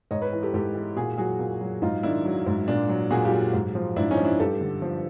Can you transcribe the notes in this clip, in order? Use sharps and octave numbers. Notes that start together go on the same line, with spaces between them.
G#2 C#5 D#5
B4 C#5
E3
G4 A4
G#2 G4 A4
E3
A#2 F#4 G#4
F#3 F#4 G#4
A#2
F#3
G#2 D#4 F4
D#3 D4 E4
F#3
G#2
A#2 D4
F#3
A#2 F#4 G#4
F4 G4
F#3
G#2
F3
G#2 D4 E4
C#4 D#4
F3
D4 E4
G2 G4 A4
D3
F3